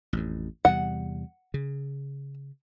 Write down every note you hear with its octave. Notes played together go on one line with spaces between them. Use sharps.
A1 F2
E2 C3 G3 F#5
C#3